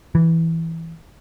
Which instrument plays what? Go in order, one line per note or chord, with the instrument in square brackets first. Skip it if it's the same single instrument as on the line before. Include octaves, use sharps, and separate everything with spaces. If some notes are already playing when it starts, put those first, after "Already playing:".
[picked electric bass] E3